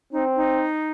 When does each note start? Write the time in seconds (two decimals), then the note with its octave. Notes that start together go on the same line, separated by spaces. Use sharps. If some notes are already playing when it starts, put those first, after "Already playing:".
0.12 C4 D#4
0.36 D#4